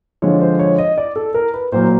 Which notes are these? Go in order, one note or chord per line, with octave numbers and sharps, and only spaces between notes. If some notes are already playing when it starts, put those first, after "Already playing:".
D3 F3 G#3 C#5
C5
C#5
D#5
D5
A4
A#4
B4
A#2 F#3 A#3 C5